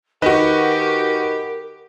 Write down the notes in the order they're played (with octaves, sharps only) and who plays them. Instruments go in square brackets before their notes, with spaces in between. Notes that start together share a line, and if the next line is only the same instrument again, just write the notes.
[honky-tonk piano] D#3 F#4 [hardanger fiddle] G4 [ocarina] A#4 [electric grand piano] B4 D#5